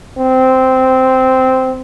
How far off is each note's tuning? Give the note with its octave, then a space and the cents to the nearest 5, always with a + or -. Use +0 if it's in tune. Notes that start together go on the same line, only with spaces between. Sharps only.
C4 -10